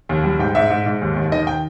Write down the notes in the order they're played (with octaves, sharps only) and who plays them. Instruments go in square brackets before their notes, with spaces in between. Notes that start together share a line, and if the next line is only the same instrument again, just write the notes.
[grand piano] D#2
G3
G#2 G5
G#2 E5
G#2
G#2
D#2
D#2
D#3 D#5
G5